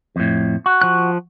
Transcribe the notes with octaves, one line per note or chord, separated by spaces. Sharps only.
F2 A2
F#4
F3 F#6